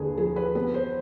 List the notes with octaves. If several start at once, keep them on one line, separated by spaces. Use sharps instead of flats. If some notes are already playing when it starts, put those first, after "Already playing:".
Already playing: D#2 D3 G#4 B4
F3 G#4
B4
B3 B4
C5